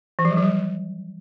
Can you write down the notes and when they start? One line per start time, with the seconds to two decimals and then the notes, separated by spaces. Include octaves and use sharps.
0.19 E3
0.25 F3
0.31 G3
0.37 F#3
0.43 G3